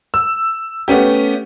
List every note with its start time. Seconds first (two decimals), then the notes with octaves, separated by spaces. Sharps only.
0.14 E6
0.88 A3 B3 C#4 G4